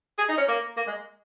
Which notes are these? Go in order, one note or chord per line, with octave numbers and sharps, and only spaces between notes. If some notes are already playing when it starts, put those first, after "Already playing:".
G#4
D#4
C#4
A#3
A#3
G#3